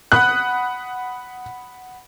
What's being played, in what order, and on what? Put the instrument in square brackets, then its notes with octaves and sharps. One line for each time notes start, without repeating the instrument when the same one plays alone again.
[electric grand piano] F#5 B5 D#6 [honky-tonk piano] F#6